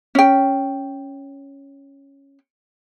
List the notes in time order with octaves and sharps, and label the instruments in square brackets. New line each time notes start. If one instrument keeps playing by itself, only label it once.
[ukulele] C#4 G5